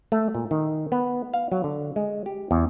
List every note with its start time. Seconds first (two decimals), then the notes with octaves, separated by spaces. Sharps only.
0.12 A3
0.35 A#2
0.51 D#3
0.92 B3
1.34 F5
1.52 F#3
1.64 D3
1.96 G#3
2.26 G4
2.51 E2